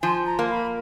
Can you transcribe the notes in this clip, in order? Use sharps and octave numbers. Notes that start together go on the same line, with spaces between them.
F3 G#5
A#5
A#3
B5